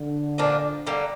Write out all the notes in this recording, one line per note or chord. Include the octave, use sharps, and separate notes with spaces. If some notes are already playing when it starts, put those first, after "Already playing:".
Already playing: D3
A#2 F3 A#3 D4
D3 G3 A#3